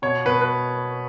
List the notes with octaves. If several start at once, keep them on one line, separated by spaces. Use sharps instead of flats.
B2 C#5
B2 B4
B4